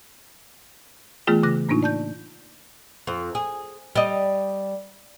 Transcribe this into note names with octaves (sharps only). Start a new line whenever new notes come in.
E3 A3 B3 F4 G#4 G5
C#3 F#6 A#6
A2 A#3 D4 D#4 F4
D5 A5 G6
F2
G#4
G3 D#5